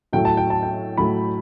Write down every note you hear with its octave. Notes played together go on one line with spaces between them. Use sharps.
A2 F#3 A3 G5
A5
G5
A5
G5
A2 F#3 A3 B5